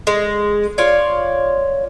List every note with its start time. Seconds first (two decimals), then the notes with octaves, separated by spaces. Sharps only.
0.07 G#3
0.78 F4 C#5 D5